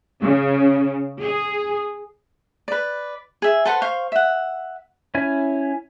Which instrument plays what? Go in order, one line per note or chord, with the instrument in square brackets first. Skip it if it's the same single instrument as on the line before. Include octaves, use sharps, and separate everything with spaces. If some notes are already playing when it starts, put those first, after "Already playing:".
[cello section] C#3
G#4
[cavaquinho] B4 D5
G#4 E5
A4 B4 C5 F#5
C5 F5 C#6
E5 F#5
[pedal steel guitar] C#4 E4 G#5